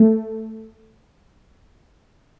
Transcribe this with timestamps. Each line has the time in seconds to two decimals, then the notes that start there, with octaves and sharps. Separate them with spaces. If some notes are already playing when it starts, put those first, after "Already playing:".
Already playing: A3